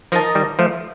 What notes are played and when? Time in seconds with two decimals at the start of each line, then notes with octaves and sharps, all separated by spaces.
0.12 F3 D#4 A#4 D#5 A5
0.35 D#3 G3
0.59 F3 A3